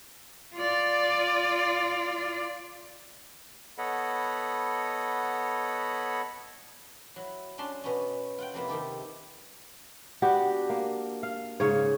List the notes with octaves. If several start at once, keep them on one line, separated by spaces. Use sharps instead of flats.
F4 D5
B3 A4 C#5 D#5 F#5 B5
F#3 E4
C#4 D4 A5 C6
B2 B3 C#4
F4 F#5 G5
F2 C3 A#3 B3 E4
C3 D#3 G4 A4
B3 D4 F#4 G4
A#3
F5
G#2 C#3 C#5